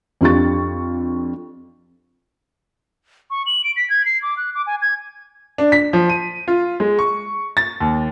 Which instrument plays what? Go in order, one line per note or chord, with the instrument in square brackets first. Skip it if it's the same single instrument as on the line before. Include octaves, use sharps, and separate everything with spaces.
[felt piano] F2 D4 F4 G4 C#6 A6
[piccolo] C#6
F#7
D7
B6
G#6
C7
D6
F#6
D6
G#5
G#6
[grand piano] D4
B6
F3
D#7
F4
G#3
C#6
A6
D#2